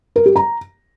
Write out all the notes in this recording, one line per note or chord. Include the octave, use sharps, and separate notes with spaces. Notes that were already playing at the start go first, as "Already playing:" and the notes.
A#4
G4
A#5